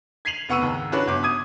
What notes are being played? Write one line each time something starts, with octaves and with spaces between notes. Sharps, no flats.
G#6 B6 C7 D#7 F7 F#7
F1 B3 F#5 C#6 E6 D#7
D#2 G#2
C#4 D4 F#4 B4 C#5
G1 D6
D#6 G#6 D#7